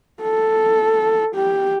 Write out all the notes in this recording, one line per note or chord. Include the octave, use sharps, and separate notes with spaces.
A4
G4